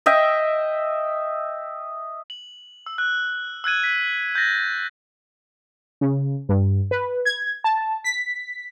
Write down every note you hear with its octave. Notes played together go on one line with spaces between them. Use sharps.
D#5 E5 G5
F#7
E6
F#6
E6 F#6 G#6 D#7
B6
G6 A6 A#6
C#3
G2
B4
G#6
A5
B6